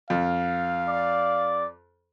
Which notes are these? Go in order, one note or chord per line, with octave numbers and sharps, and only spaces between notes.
F2 F5
D5